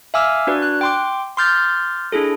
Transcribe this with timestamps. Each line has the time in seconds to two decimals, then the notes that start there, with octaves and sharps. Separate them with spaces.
0.14 E5 F5 G#5 D6 E6 F6
0.47 D4 F#4 B4 D5
0.62 F#6
0.81 G5 C6 D6
1.37 C6 D6 F6 G6 A6
2.12 D4 E4 G#4 A4